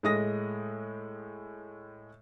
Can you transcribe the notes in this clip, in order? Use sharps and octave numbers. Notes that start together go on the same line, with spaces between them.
A2 G#3 D#6 A#6